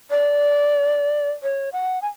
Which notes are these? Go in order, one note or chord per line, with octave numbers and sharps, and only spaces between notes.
D5
C#5
F#5
G#5